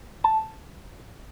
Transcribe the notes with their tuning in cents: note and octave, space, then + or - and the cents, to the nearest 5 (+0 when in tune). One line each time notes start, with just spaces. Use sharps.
A5 +0